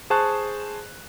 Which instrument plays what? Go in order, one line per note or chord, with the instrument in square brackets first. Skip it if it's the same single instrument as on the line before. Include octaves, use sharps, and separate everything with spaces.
[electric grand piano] G#4 C5 A5 C#6 F#6